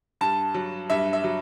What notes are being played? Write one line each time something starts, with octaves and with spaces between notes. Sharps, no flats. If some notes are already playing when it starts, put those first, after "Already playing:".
G2 A5
F#3
G2 E5
E5
F#3